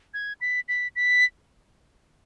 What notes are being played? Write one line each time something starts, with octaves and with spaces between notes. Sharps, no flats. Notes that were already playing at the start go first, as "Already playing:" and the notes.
G#6
B6
B6
B6